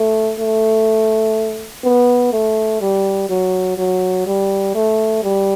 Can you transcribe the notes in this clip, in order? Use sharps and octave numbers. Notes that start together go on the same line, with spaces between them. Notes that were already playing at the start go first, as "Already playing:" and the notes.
Already playing: A3
A3
B3
A3
G3
F#3
F#3
G3
A3
G3